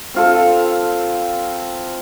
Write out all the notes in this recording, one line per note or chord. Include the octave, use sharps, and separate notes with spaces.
C4 F4 A4